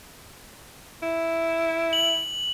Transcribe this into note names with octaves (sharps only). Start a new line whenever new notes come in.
E4
F#7